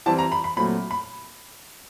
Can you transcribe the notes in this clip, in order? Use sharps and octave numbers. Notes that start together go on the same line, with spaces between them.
E3 G3 C4 A5
A#5
B5
B5
A#2 F#3 A3 C4 B5
B5